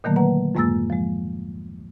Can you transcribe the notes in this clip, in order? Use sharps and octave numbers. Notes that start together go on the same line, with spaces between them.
A#2 D3 D#3 F#3 A3 A#3
A#3 B4 F#5 A#5
F2 G#2 G#3 A#3 E6 A6
F3 G#3